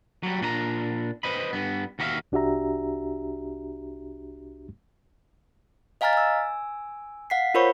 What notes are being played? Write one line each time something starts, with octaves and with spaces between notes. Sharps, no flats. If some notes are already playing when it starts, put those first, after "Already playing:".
F#3 G3
A#2 D4 C#5 A#5
B4 C5 D#5 B5
G2 B3
D#2 F#4 A#4 D5 E5 F5
C2 D4 F#4 G4 E5 A#5
D#5 F5 G#5 A#5 F6 A6
G#5 E6
F5 F#5 B6 C7
F4 A#4 C5 C#5 B5 C#6